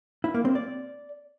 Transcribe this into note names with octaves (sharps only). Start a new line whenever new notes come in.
E4
A#3
C4
D5